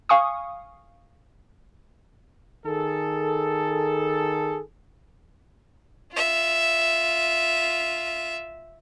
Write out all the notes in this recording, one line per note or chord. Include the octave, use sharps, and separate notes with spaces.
F5 G#5 C#6 D#6
D#3 G#4 A4
F4 E5